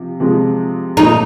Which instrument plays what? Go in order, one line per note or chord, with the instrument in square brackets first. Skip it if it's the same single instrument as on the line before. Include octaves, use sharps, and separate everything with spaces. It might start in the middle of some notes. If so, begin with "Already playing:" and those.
Already playing: [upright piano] C3 F3
C3 F3 G#3
[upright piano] A#2 F3 A3 [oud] D#4